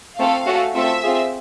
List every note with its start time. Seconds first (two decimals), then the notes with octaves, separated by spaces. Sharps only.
0.18 A3 C4 F4 A4 F5
0.46 A3 C#4 F#4 A4
0.75 A3 C4 F4 A4 E5
1.03 C4 F4 G#4